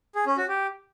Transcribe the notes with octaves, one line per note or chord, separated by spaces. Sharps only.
G#4
C#4
F#4
G4